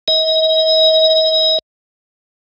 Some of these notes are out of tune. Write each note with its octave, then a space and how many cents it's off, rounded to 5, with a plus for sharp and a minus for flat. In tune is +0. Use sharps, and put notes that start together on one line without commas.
D#5 +40